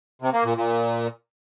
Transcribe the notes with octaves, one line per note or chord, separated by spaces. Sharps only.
C3
A#3
A#2
A#2